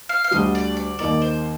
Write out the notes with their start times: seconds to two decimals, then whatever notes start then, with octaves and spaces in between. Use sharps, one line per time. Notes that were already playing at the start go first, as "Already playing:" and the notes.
0.09 F5
0.24 F5
0.31 D2 D3 G3 D#5
0.55 D5
0.77 D5
0.99 D#2 D#3 A#3 D#4 D5
1.22 C5